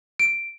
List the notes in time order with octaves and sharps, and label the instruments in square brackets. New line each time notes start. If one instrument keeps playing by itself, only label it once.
[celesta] D7